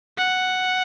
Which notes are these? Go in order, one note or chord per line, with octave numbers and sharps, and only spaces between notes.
F#5